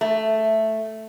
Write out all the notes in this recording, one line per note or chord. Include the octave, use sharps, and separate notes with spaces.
A3